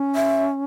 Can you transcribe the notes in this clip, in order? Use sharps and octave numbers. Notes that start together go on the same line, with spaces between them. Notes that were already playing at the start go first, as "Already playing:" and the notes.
Already playing: C#4
E5